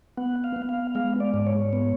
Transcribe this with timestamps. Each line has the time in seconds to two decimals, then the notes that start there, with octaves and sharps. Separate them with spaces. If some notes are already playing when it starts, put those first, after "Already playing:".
0.17 B3 F#5
0.44 F5
0.56 B3
0.69 F5
0.95 G#3 F5
1.20 D5
1.34 G#2
1.47 C#5
1.73 B3